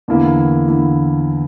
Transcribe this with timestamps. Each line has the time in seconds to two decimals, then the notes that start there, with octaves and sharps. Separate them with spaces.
0.08 E2 D3 A#3 E4
0.68 D3 A#3 E4